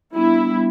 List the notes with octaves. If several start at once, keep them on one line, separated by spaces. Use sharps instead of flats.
G3 B3 D4 E4
G3 B3 D4